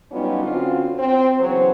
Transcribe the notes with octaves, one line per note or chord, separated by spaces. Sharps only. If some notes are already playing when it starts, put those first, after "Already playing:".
F#3 G3 B3 C#4 D#4 F4
D3 C4 C#4 F4 F#4
C4
C#3 E3 F#3 B3 C5